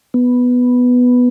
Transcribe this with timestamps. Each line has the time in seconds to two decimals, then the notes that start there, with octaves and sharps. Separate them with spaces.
0.14 B3